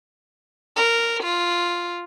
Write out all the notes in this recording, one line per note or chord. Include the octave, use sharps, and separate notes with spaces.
A#4
F4